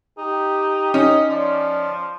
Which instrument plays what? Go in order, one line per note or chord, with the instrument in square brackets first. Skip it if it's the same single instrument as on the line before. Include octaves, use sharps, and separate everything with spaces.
[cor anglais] D#4 [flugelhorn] G4
[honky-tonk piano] C#4 [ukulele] D#4 [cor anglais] D#5
[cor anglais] F3 [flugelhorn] D5